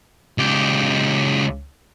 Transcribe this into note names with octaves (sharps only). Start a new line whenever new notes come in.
C#2 G4